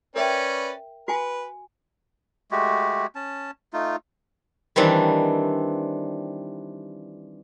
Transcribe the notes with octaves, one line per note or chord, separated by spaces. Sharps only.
C#4 A#4 B4 D5 E5 G5
F#4 B4 G#5
G#3 A3 F#4 G4
C#4 A5
A3 D#4 F4
D#3 E3 G3 C4 D4